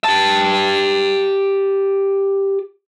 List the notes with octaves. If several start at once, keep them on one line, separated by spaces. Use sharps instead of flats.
G4 A5